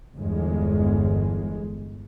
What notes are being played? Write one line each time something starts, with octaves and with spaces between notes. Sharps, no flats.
G1 E2 G#3